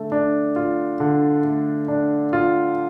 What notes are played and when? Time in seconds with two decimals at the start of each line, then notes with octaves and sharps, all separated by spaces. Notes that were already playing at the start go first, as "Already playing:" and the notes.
Already playing: D3 A3
0.12 D4
0.56 F4
1.00 D3
1.44 A3
1.88 D4
2.33 F4